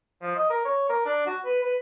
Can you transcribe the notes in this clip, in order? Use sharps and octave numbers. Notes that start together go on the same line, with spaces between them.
F3
D#5
A#4
C#5
A#4
D4
F#4
B4
B4